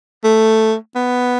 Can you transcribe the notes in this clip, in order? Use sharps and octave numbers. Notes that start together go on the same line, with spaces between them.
A3
B3